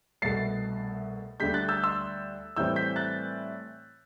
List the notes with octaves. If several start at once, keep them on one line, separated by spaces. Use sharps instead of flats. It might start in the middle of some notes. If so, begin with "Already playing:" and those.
C2 B2 A3 A6 C7
D2 D3 G3 G6 B6
F#6 A6
E6 G6
C6 E6
A2 E3 G3 C4 E6 G6
G6 B6
F#6 A6